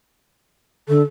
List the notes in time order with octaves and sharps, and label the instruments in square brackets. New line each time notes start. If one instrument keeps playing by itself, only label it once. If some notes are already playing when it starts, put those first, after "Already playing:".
[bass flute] D3 [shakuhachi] A4